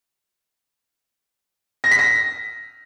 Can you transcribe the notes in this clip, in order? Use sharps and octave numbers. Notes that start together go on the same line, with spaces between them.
A#6
B6
A#6